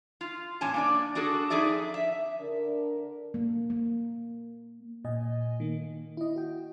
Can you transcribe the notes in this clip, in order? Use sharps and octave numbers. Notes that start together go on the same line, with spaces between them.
F4
F2 A#2 C#4 G#5 A5
A#3 D4 D5
D4 F#4 G#4 A4
F2 D#4 G#4 D5 E5
E5
D3 D4 A#4
A#3
A#3
A#2 D#5 G#5
D#3 A#3
E4 D#5
F#4 G5